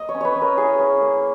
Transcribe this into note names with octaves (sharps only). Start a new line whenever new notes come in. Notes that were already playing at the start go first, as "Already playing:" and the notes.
Already playing: A#3 D#5
C#5
C#4
B4 C#5
C#4
A#4
E4 G#4
C#4
A#3